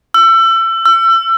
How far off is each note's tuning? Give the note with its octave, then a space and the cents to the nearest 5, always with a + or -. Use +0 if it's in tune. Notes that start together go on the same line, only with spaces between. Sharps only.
E6 +30
E6 +35